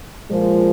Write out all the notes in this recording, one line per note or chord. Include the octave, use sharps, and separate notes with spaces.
A#2 F3 G#3